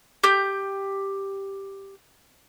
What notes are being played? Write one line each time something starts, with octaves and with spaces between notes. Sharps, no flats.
G4 G6